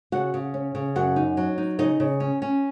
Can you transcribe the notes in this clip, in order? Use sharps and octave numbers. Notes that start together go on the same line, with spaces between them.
C#3 F#4 F#5
C#3
C#4
C#3
F#2 F#4 F#5
D#4
F#3
D#4
C#3 D#4 D#5
C#3
C#4
C#4